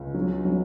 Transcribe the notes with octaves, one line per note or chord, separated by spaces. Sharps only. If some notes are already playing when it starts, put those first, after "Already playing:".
Already playing: C#2
F#3
F#3